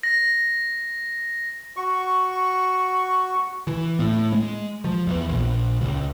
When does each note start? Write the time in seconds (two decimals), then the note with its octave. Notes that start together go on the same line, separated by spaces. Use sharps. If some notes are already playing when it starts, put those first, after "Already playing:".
0.03 A#6
1.77 F#4 C#6
3.67 E3
3.99 A2
4.32 G#3
4.84 F3
5.07 E2
5.29 A#1
5.81 C#2